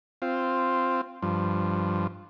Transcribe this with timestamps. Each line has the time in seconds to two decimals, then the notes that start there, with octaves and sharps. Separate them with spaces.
0.22 C4 F4
1.22 G2 F3